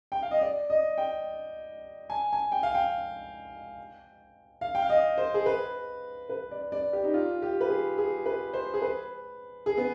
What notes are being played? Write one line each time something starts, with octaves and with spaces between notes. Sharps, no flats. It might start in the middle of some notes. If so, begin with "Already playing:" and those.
G5
F5
D#5
D5
D#5
G5
G#5
G#5
G5
F5
G5
F5
G5
F5
D#5
C5
G#4
B4
B4
D5
D5
G4
D#4
F4
G4
B4
G#4
G#4
B4
C5
G#4
B4
G#4
B3